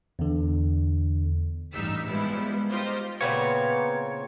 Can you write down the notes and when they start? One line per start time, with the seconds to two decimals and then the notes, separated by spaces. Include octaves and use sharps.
0.19 E2 D3
1.73 A1 G2 G3 D#4 E6 B6
2.06 F3 G3 G#3 B3 E4
2.70 D#4 F4 G4 C5 D#5
3.21 A#2 C#3 B3 C4 C#5 F5